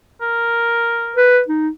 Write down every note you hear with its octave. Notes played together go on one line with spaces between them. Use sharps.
A#4
B4
D#4